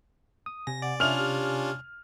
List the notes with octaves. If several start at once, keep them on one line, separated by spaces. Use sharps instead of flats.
D#6
C3 G#5 A#6
D5 F#5
C#4 D4 F4 E5 F6 F7
G4